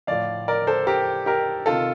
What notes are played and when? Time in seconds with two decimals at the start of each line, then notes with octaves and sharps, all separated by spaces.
0.07 A2 F3 D5 F5
0.48 A#4 D5
0.67 A4 C5
0.87 G4 A#4
1.26 G4 A#4
1.66 C3 D#3 F4 A4